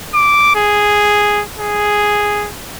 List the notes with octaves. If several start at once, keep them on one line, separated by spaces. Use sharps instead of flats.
D6
G#4
G#4